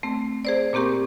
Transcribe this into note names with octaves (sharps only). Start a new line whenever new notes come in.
A3 C4
G#4 C5 D5
A#2 A#3 C4 G4 C#6